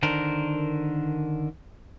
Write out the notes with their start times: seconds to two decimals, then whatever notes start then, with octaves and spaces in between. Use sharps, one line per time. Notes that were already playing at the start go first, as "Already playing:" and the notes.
0.03 D3 D#3 D4 A#4 C5